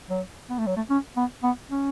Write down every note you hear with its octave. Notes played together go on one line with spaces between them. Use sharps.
F#3
B3
A3
F#3
A3
C#4
B3
B3
C#4